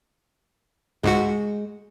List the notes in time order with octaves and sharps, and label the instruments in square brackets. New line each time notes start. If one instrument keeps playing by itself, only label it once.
[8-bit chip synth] C#2 G#2 F#4 [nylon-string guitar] G#3